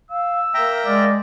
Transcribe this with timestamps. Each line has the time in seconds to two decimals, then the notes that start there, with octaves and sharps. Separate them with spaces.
0.10 F5 E6
0.54 A#3 E5 G5 A#5
0.85 G#3 D5